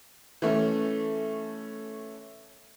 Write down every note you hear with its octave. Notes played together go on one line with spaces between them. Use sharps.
E3 A3 C#4